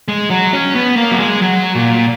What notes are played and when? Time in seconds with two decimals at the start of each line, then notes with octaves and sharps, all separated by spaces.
0.08 G#3
0.30 F#3
0.53 C#4
0.75 B3
0.96 A#3
1.11 F#3
1.19 G#3
1.42 F#3
1.75 A#2